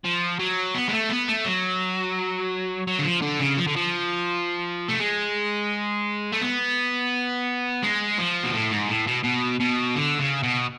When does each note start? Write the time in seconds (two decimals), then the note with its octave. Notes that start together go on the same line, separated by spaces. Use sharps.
0.04 F3
0.39 F#3
0.75 B3
0.88 G#3
0.93 A3
1.09 B3
1.28 A3
1.45 F#3
2.87 F#3
2.99 D3
3.05 F3
3.22 D3
3.40 C#3
3.57 F3
3.67 D3
3.76 F3
4.89 A3
5.00 G#3
6.32 A3
6.41 B3
7.83 G#3
8.19 F3
8.43 B2
8.53 A2
8.71 G#2
8.89 A2
9.07 B2
9.24 B2
9.60 B2
9.95 D3
10.19 C#3
10.43 B2